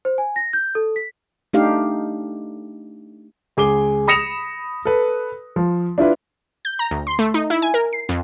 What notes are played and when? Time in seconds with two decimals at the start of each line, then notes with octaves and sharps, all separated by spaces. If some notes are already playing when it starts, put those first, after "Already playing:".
0.05 C5
0.18 G#5
0.36 A#6
0.53 G6
0.75 A4
0.96 B6
1.54 A3 D4 D#4 G4 F5
3.57 C#2 G#4 D6 G7
4.08 B5 D#6 A#6 C#7 E7 F7
4.85 A4 B4
5.56 F3
5.98 D4 E4 F4 B4
6.65 G6
6.79 A#5
6.91 D2
7.07 C6
7.19 A3
7.34 D#4
7.50 E4
7.62 G#5
7.74 A#4
7.93 C7
8.09 F2